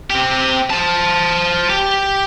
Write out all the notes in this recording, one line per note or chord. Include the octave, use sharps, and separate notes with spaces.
C4 G4
C5 A5
G4